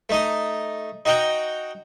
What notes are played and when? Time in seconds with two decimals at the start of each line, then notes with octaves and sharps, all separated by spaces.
0.09 A3 D#4 D#5
1.05 D#4 F#4 D#5 G5 A#5